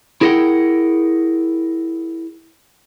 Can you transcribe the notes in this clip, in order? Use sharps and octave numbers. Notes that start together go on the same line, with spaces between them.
E4 G#4 A#4 D#5 F#5 G5